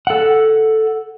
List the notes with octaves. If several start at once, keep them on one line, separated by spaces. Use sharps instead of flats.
A4 F#5